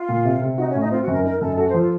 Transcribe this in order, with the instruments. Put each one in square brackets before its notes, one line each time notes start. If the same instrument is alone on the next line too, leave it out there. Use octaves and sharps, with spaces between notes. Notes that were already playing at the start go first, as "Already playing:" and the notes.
Already playing: [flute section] F4
[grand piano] A#2
C3
C3
[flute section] D#4 [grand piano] F#4
[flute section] C#4
[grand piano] A2
[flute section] D#4
[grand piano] C4 [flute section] F4
[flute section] F#4
[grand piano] F#2
[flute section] A#4
[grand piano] D#4 [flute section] A#4
[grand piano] F#2 [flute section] A4
[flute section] F#4 [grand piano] A4
[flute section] C5
[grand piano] F3
[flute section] F4